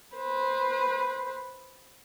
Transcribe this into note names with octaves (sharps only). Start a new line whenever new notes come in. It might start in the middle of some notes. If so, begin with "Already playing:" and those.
B4 C5